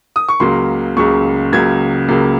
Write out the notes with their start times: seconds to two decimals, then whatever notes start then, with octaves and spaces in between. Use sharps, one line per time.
0.16 D#6
0.29 C#6
0.40 C#2 C#3 F#3 A#3 C6
0.97 C#2 C#3 F#3 A#3 C#6
1.52 C#2 C#3 F#3 A#3 G#6
2.09 C#2 C#3 F#3 A#3